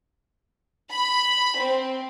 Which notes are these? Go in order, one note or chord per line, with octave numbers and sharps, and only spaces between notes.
B5
C4